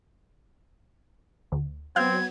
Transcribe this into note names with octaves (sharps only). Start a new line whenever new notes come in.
D2
F#3 B3 C4 F5 F6 G6 G#6